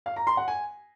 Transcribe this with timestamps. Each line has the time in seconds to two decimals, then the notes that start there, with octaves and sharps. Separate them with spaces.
0.06 F5
0.16 A#5
0.27 C6
0.37 F#5
0.48 G#5